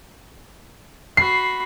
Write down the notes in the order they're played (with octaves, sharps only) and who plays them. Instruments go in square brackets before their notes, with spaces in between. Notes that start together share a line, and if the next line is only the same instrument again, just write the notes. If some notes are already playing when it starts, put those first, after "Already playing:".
[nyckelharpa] F#4 B5 [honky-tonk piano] C7